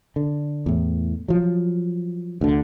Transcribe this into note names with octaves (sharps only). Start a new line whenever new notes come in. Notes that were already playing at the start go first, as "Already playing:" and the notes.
D3
E2 A2
F3 F#3
D2 D3